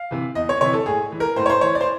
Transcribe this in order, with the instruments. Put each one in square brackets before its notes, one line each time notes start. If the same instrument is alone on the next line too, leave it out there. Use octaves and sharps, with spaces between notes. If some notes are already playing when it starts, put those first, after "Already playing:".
Already playing: [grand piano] F5
C3 E3
E2 D#5
C#5
C3 E3 C#5
A4
A2 G#4
E3
A#4
A2 C5
C#5
C5
E3 C#5
D5
C5